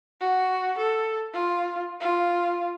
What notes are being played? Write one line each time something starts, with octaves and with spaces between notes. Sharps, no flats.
F#4
A4
F4
F4